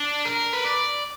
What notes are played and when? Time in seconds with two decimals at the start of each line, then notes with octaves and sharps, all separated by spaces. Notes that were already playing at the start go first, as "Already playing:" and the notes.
Already playing: D4
0.25 A#4
0.53 B4
0.64 D5